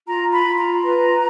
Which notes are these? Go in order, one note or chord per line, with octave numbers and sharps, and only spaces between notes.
F4 A#5
B5
F4
A#5
B4